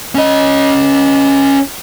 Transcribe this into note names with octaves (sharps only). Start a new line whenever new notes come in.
C#4 D#5